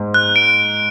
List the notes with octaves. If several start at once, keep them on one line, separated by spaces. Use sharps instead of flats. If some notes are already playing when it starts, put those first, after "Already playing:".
Already playing: G#2
F#6
D7